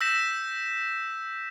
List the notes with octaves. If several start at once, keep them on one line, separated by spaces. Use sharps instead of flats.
E6 G6 A#6 B6 E7